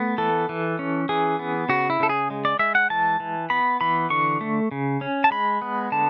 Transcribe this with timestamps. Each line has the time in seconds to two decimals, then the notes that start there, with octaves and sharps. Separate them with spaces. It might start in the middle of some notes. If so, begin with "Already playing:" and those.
Already playing: A3 B3
0.18 E3 A4
0.49 E3
0.79 C#4
1.09 E3 G#4
1.39 B3
1.69 C#3 F#4
1.90 E4
2.00 C#3 A4
2.09 G#4
2.30 G#3
2.45 D5
2.59 G#3 E5
2.75 F#5
2.90 E3 A5
3.20 E3
3.50 B3 B5
3.81 E3 B5
4.10 D3 C#6
4.41 A3
4.71 C#3
5.01 C#4
5.24 A5
5.31 G#3 B5
5.62 B3
5.92 D3 A5